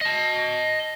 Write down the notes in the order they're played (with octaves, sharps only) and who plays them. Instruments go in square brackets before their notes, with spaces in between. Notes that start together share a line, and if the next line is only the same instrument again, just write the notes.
[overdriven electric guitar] D#5 A5